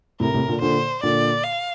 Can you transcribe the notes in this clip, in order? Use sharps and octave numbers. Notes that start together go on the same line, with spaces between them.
A2 C3 A#4
A2 C3
A#2 D3
A#2 D3 C5
A#2 D3 D5
F5